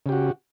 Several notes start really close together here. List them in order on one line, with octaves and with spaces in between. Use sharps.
C#3 G4 F#4